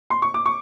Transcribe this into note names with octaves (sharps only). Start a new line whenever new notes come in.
C6
C#6
D6
C#6